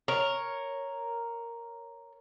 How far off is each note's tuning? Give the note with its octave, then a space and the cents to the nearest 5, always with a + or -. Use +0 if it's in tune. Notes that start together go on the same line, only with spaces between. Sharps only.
A#4 +0 C#5 +0